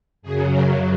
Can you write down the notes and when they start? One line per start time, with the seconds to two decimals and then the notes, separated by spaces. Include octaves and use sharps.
0.22 F#2 C#3 F#3 G#4
0.50 A#4